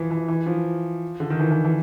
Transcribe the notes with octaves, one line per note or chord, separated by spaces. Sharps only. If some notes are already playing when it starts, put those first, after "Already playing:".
Already playing: E3 F3
E3
E3
F3
D3
D#3
E3
E3
E3